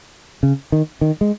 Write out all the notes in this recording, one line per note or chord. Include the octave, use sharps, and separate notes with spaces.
C#3
D#3
D#3
G#3